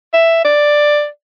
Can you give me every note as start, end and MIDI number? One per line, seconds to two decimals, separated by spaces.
0.13 0.43 76
0.45 1.07 74